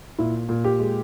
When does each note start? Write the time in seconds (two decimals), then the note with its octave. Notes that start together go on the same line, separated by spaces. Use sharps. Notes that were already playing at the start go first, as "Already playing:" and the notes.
0.18 A#2 E4
0.49 A#2
0.64 G4
0.80 G#3